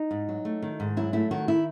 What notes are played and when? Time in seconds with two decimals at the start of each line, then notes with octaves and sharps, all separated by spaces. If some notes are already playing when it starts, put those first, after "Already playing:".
Already playing: D#4
0.11 G#2
0.29 F#3
0.45 A3
0.62 D#3
0.80 G#2
0.97 F#3 E4
1.13 A3 E4
1.31 D#3 F#4
1.48 E4